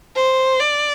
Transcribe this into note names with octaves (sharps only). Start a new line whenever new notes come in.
C5
D5